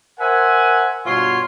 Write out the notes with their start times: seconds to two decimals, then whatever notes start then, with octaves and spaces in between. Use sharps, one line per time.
0.20 A#4 C5 E5 F#5 G#5
1.06 G2 B2 F4 C#5 C6